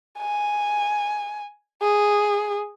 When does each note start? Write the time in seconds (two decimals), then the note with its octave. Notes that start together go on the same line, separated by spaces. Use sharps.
0.20 G#5
1.82 G#4